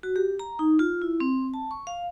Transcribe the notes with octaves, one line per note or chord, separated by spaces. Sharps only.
F#4
G4
A#5
D#4
F4
E4
C4
A5
C#6
F5